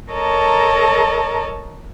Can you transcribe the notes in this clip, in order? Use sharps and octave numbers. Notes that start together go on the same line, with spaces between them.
A4 A#4 C#5 D#5 A5 A#5